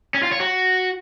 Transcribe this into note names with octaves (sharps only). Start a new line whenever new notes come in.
C#4
F4
C#5
F#4